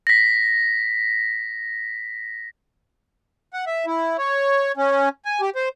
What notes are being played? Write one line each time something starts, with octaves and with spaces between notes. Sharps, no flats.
A#6 B6
F#5
E5
E4
C#5
C#4
G#5
G4
C5